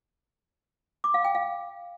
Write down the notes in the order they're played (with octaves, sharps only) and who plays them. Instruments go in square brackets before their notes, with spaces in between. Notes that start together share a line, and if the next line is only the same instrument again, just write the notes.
[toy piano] D6
F5
G5
F5